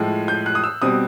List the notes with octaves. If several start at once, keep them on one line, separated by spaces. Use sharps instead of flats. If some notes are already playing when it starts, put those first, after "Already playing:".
Already playing: A2 F3 G#3
G6
F#6
D#6
E6
B2 G3 C4 D#6